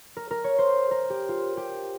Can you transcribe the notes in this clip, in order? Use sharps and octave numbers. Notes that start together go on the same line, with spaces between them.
A#4
A#4
C#5
C5
A#4
G4
F4
G4